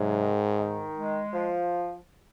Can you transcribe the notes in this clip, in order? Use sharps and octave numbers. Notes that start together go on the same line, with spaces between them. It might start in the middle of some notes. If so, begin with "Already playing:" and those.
Already playing: G#2 C3 F#3
D#3
D#3
G#3
F3